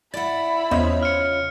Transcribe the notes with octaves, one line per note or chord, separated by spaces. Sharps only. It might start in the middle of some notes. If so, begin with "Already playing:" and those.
E4 D5 F#5 B5 A6
E2 C#3 F4 C5 C#5 D#5
F6 C#7